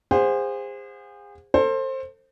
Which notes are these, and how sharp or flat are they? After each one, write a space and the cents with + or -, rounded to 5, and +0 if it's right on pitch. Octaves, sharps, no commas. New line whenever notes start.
G#4 -35 C5 +0 F#5 -35
A4 +35 C5 +20